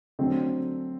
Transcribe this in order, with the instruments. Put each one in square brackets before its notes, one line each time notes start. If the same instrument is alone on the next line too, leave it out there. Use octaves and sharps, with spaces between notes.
[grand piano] D3 F#3 A3 C4